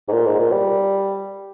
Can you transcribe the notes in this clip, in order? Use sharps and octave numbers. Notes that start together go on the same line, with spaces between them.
G#2
A#2
G#2
A#2
G3